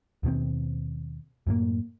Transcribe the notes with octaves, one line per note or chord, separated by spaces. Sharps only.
D#2 B2 D#3 C4
F#2 A2 A#3